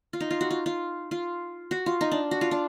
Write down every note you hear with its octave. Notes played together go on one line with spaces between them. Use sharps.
F4
D#4
F4
F#4
F4
F4
F4
F#4
F4
D#4
D4
F#4
F4
D4